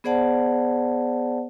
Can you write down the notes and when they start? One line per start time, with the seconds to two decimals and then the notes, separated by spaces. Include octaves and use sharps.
0.04 B3 G#4 C5 D5 F#5 A5